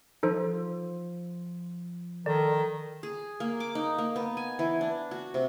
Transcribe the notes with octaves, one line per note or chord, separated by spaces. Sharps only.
F3 D#4 A4 C5
D#3 A4 D5
G#4
A#3
D6
D#4
A#3
B3
G#5
E3
D4
F#4
C3